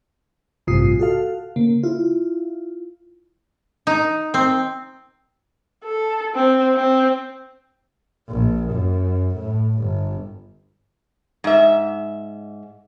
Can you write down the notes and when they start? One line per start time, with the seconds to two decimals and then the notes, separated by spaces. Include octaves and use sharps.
0.67 A1 G2 C3 F4 D#6 C7
1.00 F#4 A4 F5
1.56 C#3 A#3
1.83 E4 F4
3.87 D#4
4.34 C4
5.84 A4
6.35 C4
6.76 C4
8.29 A#1
8.71 F#2
9.34 A2
9.79 G1
11.44 G#2 E5